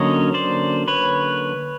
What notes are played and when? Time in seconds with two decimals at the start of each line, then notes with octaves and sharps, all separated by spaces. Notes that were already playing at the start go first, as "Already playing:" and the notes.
Already playing: D3 F#3 A#3 C#4 C#5 D#5
0.34 C5 D5
0.88 B4 C#5